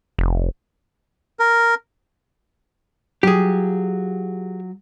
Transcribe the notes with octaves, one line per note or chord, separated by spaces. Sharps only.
F1
A#4
F#3 F4 G4 G#4